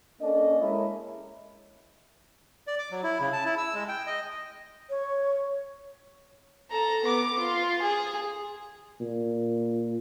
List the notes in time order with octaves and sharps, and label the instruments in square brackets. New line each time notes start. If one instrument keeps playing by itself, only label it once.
[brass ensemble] A#3 C#4 D4 A4 D#5
G#3 E4 A#4 C#5 D#5 E5
[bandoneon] D5
D6
F#3
E4
C#3
A5
E4
E6
G#3
G5
D#5
[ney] C#5
[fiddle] A4 A#5
B3 D6
F4
G#4
[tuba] A#2